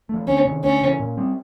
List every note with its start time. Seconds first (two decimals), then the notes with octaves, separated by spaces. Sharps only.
0.09 F3 A3
0.28 D2 C#4
0.45 C3 D#3
0.64 D2 C#4
0.81 C#3
0.86 E3
1.00 A#2
1.17 G3 C4